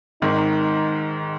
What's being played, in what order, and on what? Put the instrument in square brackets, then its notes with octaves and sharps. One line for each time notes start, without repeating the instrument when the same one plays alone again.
[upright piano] G#1 G#2 D#3 [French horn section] D#4